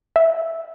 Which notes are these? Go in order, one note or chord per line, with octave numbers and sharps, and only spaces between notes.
E5